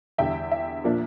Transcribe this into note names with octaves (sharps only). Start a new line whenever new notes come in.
E2 D3 G3 E5 G5
E5
A#2 F3 A#3 D4